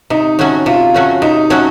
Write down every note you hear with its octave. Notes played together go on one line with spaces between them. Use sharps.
C3 D#4
F#3 A3 C#4 F#4
C3 F4
F#3 A3 C#4 F#4
C3 D#4
F#3 A3 C#4 F#4